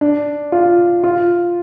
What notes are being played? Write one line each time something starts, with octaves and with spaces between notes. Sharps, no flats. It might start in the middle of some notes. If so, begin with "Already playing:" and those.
D4
F4
F4